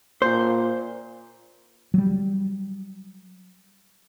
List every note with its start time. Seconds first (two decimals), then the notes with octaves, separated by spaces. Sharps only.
0.22 A#2 C5
1.94 F#3 G3